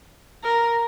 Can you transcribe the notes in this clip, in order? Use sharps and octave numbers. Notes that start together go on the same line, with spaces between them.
A#4